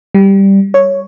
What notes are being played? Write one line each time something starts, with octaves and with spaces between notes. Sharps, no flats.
G3
C#5